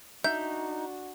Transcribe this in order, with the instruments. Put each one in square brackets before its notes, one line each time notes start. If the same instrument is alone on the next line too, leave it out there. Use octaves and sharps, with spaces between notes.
[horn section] D4 F#4 [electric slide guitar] D#4 [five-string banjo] E5 [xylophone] G6